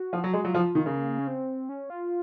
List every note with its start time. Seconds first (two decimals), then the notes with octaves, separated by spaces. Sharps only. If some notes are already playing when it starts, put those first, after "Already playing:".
Already playing: F#4
0.13 F3
0.24 F#3
0.33 G#3
0.44 F#3 F4
0.55 F3
0.75 D#3
0.86 C#3 A#3
1.19 C#4
1.27 C4
1.69 C#4
1.90 F4